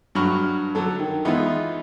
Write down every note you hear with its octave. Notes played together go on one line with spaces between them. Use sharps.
G2 F#3 B5 C#6 F6
D3 F#3 A4
D#3
E3 G#3 B3 D#4 F4